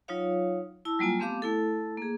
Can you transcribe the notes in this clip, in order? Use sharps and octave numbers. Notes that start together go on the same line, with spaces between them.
F#3 D#4 F4 C#5 F5
E4 A5 E6
F#3 G3 A#3 F4 G#5
A3 B3 C4 G4 F5 D6
A3 E4 A4
A#3 G#4